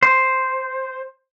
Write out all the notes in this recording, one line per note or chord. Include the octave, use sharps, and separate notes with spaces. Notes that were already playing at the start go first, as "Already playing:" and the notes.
C5